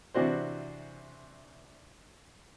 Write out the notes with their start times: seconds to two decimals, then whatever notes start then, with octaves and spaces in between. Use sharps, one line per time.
0.14 C3 E3 D4 F#4 C5